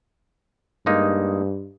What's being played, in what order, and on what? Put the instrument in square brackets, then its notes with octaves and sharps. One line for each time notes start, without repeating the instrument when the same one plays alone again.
[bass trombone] G2 [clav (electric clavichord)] G#3 A#3 D#4